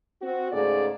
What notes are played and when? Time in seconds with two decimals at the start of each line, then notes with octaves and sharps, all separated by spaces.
0.22 C4 F#4
0.52 G#2 C#3 A3 G#4 D5